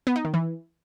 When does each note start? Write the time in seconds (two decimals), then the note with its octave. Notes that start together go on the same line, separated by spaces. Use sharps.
0.07 B3
0.16 D#4
0.25 D#3
0.34 E3